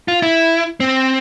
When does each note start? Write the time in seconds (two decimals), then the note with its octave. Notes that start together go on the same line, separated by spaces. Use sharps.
0.08 F4
0.22 E4
0.80 C4